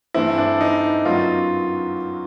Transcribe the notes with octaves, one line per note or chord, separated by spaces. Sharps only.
G2 E3 A3 C4 E4
D4
D#4
F#2 D#3 F#3 B3 F4